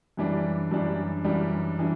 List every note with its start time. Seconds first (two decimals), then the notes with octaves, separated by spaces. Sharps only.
0.17 F#2 E3 G3 D4
0.71 F#2 E3 G3 D4
1.24 F#2 E3 G3 D4
1.79 E3 G3 D4